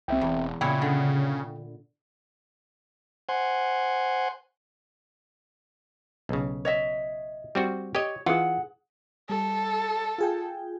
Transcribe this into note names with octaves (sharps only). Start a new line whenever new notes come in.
C2 C4 E5 G5
E1 E2
A#2 C#3 E4 C#5 G5
D3
C5 F#5 G#5
B1 C#3
C#5 D#5 E5
G3 C4 F#4
G4 C#5 D#5
E3 F4 G#4 F#5
G3 A4
F4 G#4 G5